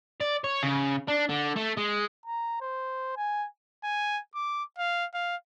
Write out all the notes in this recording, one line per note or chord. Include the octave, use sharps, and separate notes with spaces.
D5
C#5
C#3
D4
D3
A3
G#3
A#5
C5
G#5
G#5
D6
F5
F5